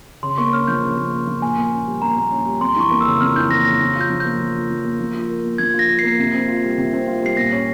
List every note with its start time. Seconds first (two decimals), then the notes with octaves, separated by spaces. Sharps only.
0.23 C#3 C6
0.38 A#3 C#6
0.53 C#4 F6
0.68 F3 G6
0.83 C#3
0.97 A#3
1.12 C#4
1.27 F3
1.42 A#2 G#5
1.57 A#3
1.72 C#4
1.87 G3
2.02 A#2 A#5
2.17 A#3
2.31 C#4
2.46 G3
2.61 F2 C6
2.76 E3 C#6
2.91 A#3
3.01 E6
3.06 C#3
3.20 F2 F6
3.36 E3 G6
3.50 A#3 A#6
3.65 C#3 A#6
3.80 F3 A#6
3.95 F4
4.01 G6
4.10 F3
4.20 A#3 G6
4.39 F3
4.54 F4
4.70 F3
4.85 A#3
5.00 F3
5.14 F4
5.29 A#4
5.44 A#3
5.58 F3 G#6
5.74 F4
5.79 A#6
5.89 A#4
5.99 A#3 C7
6.19 C3
6.34 C4
6.48 F4
6.63 G3
6.78 C3
6.93 C4
7.07 F4
7.22 G3 C7
7.37 A#2 A#6
7.52 C#4